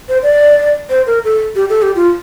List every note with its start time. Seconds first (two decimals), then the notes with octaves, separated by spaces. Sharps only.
0.09 C5
0.23 D5
0.90 C5
1.07 A#4
1.25 A4
1.56 G4
1.69 A4
1.82 G4
1.96 F4